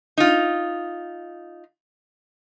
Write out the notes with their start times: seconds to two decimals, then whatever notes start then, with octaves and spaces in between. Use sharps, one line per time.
0.18 D#4 F4